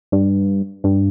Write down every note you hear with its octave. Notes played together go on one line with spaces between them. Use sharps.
G2
G2